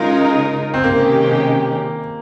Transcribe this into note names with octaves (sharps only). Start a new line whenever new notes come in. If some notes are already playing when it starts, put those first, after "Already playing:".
Already playing: C#3 G#3 D#4 F4 A#4
C4
C3 D#3 G#3 A#3 C#4 G4